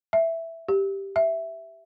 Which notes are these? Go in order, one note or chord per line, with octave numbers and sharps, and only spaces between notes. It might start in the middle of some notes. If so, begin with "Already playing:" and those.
E5
G4
E5